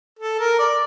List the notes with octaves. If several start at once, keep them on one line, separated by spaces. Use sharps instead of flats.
A4
A#4
D5